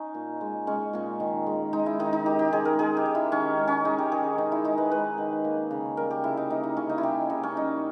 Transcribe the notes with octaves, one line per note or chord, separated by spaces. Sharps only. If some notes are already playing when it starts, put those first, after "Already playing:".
Already playing: C#4 D#4
A#2
G#3
G#3 C#4
A#2 C#4
D#3
G#3
G#3 D#4
E4
D#3 D#4
D#4
D#3 G4
G4
G#3 G#4
A#4
G#3 G#4
G4
D#3
E4
D#3 C#4
G#3
C#4
G#3 D#4
G4
D#3 G#4
D#3 D#4
E4
G#3 D#4
B4
G#3 B4
D#3
A#3
C#3
G3 A#4
G4
C#3 E4
D#4
A#3 D#4
E4
C#3 C#4
D#4
E4
G3 G4
C#3 D#4
C#4
G3 D#4